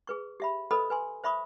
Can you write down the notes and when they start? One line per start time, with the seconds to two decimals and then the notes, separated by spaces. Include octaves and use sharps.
0.07 G#4 B4 C#6
0.40 G4 E5 B5
0.71 A4 B4 C5 D#5 B5 D#6
0.90 B4 G#5 C6
1.24 C5 E5 B5 C#6 D#6